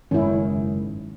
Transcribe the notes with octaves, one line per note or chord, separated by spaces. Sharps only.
F#1 G#2 D#3 C#4 E4